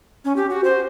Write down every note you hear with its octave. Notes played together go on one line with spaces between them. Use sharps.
C#4
G4
F#4
C5